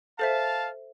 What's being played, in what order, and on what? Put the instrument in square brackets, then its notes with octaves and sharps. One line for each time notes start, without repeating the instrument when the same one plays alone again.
[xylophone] A4 C5 E5 [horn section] F5 A5